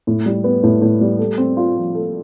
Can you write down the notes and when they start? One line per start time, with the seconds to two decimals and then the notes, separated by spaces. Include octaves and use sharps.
0.07 A2
0.26 G3
0.44 B3
0.63 A2
0.82 A2
1.01 G3
1.19 A4
1.38 C4
1.57 F4
1.76 F3
1.95 A4